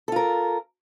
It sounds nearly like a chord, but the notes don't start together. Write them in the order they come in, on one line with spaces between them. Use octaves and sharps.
A4 F4 A#4